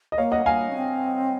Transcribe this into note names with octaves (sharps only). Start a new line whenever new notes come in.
D#5
A#3 C#5 F5
D#5 F#5
A#3 F5 G#5
C#4
C4